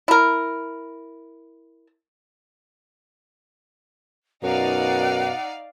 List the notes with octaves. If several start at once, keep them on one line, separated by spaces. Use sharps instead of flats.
E4 A#4
F#2 B2 D#4 D5 F5 F#5